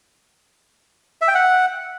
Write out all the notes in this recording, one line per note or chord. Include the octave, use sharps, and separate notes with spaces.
E5
G5
F#5